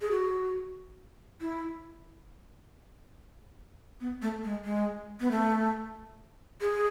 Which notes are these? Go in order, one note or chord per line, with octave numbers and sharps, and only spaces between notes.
G#4
F#4
E4
B3
A3
G#3
G#3
B3
A3
G#4